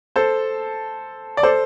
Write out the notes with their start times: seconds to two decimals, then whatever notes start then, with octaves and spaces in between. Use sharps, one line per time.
0.16 A4 C5
1.37 D5
1.43 A4 C5